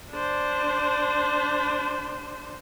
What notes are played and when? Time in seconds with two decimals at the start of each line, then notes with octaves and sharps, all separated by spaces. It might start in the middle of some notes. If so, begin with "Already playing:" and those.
0.11 D4 C5